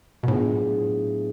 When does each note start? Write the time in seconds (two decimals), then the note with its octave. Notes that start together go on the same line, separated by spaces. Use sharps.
0.23 B2
0.27 A2 F#3 B3 D4 F4 G#4